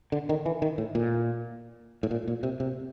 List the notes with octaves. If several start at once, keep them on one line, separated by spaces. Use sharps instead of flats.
D3
D#3
E3
D#3
A2
A#2
A2
A#2
A#2
C3
C3